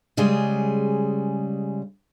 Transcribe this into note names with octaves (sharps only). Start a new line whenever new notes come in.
C#3 G3 G#3 G#4